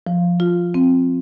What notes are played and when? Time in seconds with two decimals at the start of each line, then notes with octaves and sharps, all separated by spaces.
0.07 F3
0.40 F4
0.74 C4